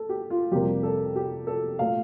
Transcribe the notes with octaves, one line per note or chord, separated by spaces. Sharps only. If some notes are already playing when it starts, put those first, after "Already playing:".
Already playing: A4
G4
F4
F2 C3 G3 A#3 G4
A4
G4
A4
A#2 A3 F5